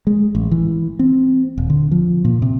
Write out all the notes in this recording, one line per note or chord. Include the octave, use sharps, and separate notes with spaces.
G#3
A1
E3
C4
D#1
D3
F3
A#2
C3